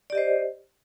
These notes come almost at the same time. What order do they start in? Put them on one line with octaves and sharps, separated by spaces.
D5 G4 D#5 C5